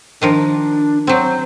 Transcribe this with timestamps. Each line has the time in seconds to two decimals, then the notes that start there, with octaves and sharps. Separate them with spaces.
0.22 D#3 F3 D4 A#4
1.07 F#3 C4 C5